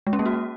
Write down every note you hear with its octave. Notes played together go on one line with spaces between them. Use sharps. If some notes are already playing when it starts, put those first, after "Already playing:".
G#3
C#4
A#3
F#4